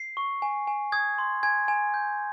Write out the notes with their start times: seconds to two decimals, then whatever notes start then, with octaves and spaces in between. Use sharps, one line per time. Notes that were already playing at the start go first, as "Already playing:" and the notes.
Already playing: C7
0.17 C#6
0.42 G#5
0.67 G#5
0.92 D#6 G#6
1.18 C6
1.43 G#5 G#6
1.68 G#5
1.94 G6